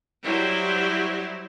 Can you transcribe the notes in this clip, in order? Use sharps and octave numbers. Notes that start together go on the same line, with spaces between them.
F#3 G3 E4 G4 C5